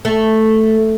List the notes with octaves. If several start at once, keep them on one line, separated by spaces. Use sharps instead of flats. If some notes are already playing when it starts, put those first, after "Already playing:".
A3